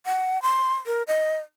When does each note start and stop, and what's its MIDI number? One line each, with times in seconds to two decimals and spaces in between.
0.06 0.42 78
0.42 0.74 84
0.86 1.03 70
1.07 1.36 75